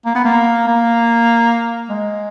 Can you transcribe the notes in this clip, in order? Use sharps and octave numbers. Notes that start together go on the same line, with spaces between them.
A#3
B3
A#3
A#3
G#3